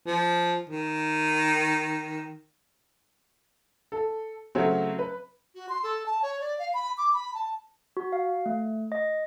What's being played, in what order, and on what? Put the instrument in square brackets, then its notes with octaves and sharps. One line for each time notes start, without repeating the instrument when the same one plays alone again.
[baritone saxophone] F3
D#3
[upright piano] A4
C#3 F#3 A3 C4 C#4
B4
[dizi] F#4
C6
A4
A5
C#5
D5
F5
B5
D6
B5
A5
[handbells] F#4
F5
A3
D#5